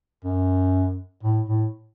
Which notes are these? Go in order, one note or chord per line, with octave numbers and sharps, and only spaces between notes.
F#2
A2
A2